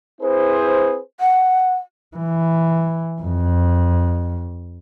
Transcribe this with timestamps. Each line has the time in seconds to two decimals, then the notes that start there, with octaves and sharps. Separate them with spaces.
0.22 C4 E4 G#4 B4 C5
1.20 F#5
2.17 E3
3.22 F2